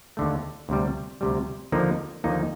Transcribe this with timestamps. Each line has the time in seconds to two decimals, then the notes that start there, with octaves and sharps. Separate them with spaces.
0.17 D#2 D3 A3
0.69 D2 C3 G3
1.21 D2 C3 G3
1.72 D#2 D3 F3 A#3 D#4
2.24 D#2 D3 F3 A#3 D#4